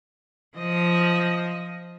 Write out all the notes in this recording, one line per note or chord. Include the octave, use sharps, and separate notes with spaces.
F3 D#5